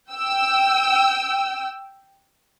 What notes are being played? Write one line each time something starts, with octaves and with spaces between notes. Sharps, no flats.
G5 E6